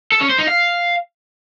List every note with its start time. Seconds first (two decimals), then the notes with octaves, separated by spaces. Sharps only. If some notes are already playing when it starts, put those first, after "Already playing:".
0.12 A4
0.21 C#4
0.30 C5
0.39 D#4
0.47 F5